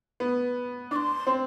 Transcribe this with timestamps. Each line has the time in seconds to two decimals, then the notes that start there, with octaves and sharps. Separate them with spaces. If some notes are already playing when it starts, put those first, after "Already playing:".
0.20 B3
0.91 D4 D6
0.96 C6
1.27 C4